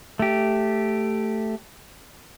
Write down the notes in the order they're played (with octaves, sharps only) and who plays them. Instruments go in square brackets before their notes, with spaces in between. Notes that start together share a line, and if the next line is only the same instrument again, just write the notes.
[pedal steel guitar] A3 G4